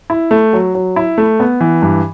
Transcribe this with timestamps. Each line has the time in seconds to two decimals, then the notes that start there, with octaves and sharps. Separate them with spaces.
0.10 E4
0.31 A3
0.53 F#3
0.75 F#3
0.96 E4
1.18 A3
1.40 B3
1.61 E3
1.82 G2